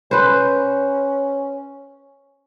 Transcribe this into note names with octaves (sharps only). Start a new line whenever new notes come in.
C#4 B4 C5